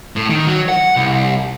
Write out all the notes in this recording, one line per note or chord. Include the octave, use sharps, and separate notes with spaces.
A2
D#3
F#3
F#5
C2